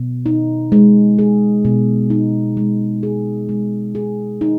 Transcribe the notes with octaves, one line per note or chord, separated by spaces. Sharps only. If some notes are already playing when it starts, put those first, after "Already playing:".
Already playing: B2
D#4
G#3
G#4
B2
D#4
G#3
G#4
G#3
G#4
D#4